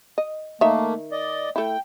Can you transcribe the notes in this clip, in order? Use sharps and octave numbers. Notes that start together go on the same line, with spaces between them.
D#5
D#3 A3 A#3 E5
D5 D#5
A3 E4 G5